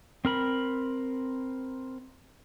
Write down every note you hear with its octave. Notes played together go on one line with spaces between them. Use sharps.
C4 A#4 B5